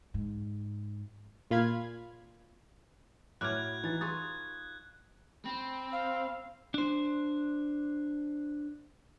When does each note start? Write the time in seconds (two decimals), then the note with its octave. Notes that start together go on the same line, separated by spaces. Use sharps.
0.14 G#2
1.51 A#2 F4 F5 B5 G#6
3.41 A2 F#3 E4 B4 D6 F6 F#6 G#6
3.83 E3 D#4 A6
4.01 F4 G#4 B4 C#6 D#6 A6
5.45 C4 B5
5.92 F5
6.74 D4 C5